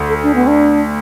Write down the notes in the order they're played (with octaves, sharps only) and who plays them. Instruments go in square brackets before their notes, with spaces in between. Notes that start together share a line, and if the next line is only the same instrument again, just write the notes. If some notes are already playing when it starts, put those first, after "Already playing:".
Already playing: [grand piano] D2
[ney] A4
D4
B3
D4